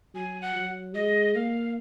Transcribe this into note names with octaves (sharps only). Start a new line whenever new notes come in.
F#3 G#5
F#5
F#3
G#3 D#5
A#3 F5